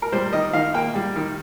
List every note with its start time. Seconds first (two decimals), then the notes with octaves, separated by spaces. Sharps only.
0.02 A#4
0.12 G3 C5
0.33 D#3 D#5
0.53 D#3 F5
0.74 A#3 G5
0.95 G3
1.16 D#3